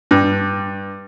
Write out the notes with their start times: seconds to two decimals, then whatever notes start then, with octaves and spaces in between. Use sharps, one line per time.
0.11 G2